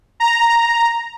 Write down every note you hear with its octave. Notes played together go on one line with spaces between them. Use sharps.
A#5